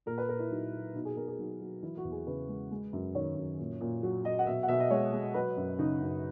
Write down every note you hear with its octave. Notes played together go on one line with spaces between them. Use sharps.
A#2 A#4
B4
A#2 A#4
E4
F#3 D#4
F#3
B2 D#4
G#4
B2 A#4
G#4
F#3 D#4
F#3
E3 E4
F#4
E2
G#4
C#3 B4
G#3
G#3
F#2
D#3 C#5
F#2
A#2
A#2
F#3
F#3 D#5
F#5
B2 E5
F#5
B2 E5
D#5
G#3 C#5
G#3
F#3 B4
F#2
C#3 D#4
F#2